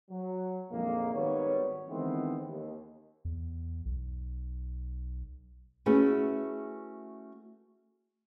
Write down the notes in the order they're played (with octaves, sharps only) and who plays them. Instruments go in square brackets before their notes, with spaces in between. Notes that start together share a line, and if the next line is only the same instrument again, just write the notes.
[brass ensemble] F#3
A#1 F2 G#2 D#3 G#3 A#3
G#1 D#3 G3 B3 A#4 C#5
D#3 E3 G#3 A3 B3 C4
D#2
[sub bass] E2
B1
[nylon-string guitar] A3 C#4 E4 F#4 G#4 B4